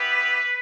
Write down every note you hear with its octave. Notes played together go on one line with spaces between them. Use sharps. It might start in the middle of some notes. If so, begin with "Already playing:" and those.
Already playing: B3 E4 G4 B4